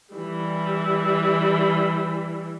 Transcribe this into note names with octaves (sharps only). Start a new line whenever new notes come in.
E3 G3